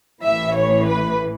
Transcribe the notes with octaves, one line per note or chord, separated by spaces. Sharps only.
A1 A2 E3 E5
C#5
B4